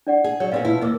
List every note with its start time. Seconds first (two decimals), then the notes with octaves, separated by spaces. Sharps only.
0.07 D4 D5 F#5
0.24 G#4
0.40 F#3 C#5 D5
0.52 A#2 C4 G#4 B4 D#5 F5
0.65 B2 F3 E4
0.81 D#2 A#3 D#5 D6 E6